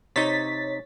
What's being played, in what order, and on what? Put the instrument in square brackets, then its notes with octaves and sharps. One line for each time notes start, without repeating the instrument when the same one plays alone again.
[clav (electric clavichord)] C3 D#4 [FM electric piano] C#5 A6 B6